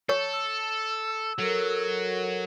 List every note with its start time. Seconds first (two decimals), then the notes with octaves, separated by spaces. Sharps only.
0.09 A4 C#5 C#6
0.33 E6
1.39 F#3 A4 A#4